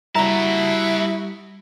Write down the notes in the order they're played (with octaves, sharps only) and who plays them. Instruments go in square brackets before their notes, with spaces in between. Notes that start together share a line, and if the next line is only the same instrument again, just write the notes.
[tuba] G3 [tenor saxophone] E4 [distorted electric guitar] F#4 A5 [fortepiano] A#5